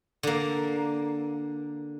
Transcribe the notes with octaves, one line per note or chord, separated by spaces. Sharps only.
D3 A#3